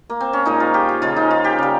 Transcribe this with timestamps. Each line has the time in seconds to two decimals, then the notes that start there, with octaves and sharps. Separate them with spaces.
0.10 A#3
0.20 C4
0.33 C#4
0.45 A#2 F3 G#3 D#4
0.60 F4
0.74 G4
0.89 G#4
1.02 C#3 F3 G#3 F4
1.16 D#4
1.31 F4
1.44 G4
1.59 C#3 G3